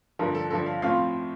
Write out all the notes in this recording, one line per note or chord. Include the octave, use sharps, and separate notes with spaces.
G2 D3 F3 A#4
A4
G2 D3 F3 A4
F5
A2 F3 C4 F4 F5